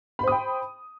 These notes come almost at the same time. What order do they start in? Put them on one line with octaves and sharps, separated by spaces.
B5 C5 D#6 G5